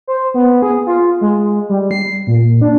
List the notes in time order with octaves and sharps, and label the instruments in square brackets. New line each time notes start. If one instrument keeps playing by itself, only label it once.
[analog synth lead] C5
B3
G#4
F4
G#3
G3
C7
A#2
D4